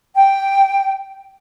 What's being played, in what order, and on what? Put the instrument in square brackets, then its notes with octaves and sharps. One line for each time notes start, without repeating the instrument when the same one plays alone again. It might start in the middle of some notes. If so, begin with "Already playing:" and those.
[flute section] G5